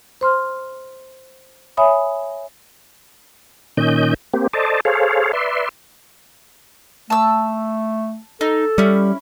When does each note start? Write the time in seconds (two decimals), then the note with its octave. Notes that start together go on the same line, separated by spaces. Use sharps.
0.21 C5 C6 F6
1.77 C#5 E5 G#5 B5 D#6
3.77 A#2 D#3 C#4 D#5 G6
4.34 A#3 C4 G4
4.53 A4 C5 D5 D#5 A5
4.85 G#4 A4 C5 C#5 F5
5.33 B4 D5 E5 C6
7.10 A3 A5 E6
8.41 D#4 A4
8.78 G3 C#4 E4